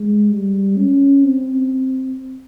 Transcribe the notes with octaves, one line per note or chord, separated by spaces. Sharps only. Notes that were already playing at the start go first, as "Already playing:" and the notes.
Already playing: G#3
G3
C#4
C4